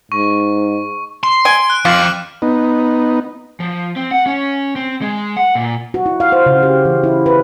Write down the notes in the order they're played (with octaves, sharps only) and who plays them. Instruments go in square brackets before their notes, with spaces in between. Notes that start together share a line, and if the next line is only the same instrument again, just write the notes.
[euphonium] G#2 [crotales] C#6
[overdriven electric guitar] C6
[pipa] G#5 [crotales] D7
[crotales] F#6
[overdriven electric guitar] F2 [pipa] F4 [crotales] D6 F6 F#7
[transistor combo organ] B3 D#4
[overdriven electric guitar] F3
C4
F#5
C#4
C4
G#3
F#5
A#2
[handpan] F#4
E4
F5
C5
C#3
G4
E3
E4
B4